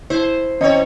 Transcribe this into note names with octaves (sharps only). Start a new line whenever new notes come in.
E4 C5 A5
E3 C4 C#4 C#5 D#5